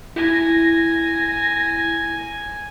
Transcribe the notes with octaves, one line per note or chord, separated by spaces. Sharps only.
E4 G#5 A#6